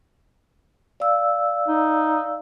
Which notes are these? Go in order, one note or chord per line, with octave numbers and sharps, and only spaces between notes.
D5 F5 E6
D#4